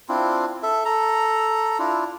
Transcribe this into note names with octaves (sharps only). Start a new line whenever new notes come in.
C4 D4 E4 F4
A4 E5
A4 A#5
D4 E4 F4